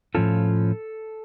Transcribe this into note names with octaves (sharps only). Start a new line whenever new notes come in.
A2 F3 C#4 F4 A4